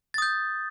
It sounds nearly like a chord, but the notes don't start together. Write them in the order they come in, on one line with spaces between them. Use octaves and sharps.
A6 D#6 G6